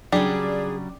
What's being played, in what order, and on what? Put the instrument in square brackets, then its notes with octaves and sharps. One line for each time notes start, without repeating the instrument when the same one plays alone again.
[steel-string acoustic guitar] C#3 F#3 [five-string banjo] G3 [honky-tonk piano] D4 [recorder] G#4